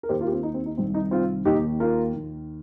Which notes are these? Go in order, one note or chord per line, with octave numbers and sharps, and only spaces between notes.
A#4
D#2 D#3 G4 C5
F4 A#4
G4
C4 F4
D#4
C4
D#4
C2 C3 D#3 C4
D#4
C4 F4
D#2 D#3 D#4 G4
F4 A#4
D#2 D#3